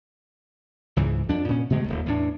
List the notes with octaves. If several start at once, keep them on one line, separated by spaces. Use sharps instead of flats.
C#2 G#2 E3
F2 D4
A#2 C#4
B2 D3 G#3 A3
D#1 G#1 D#2
E2 A2 D4